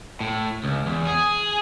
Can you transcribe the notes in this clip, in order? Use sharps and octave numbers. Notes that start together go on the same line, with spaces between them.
A2
C#2
E2
G#4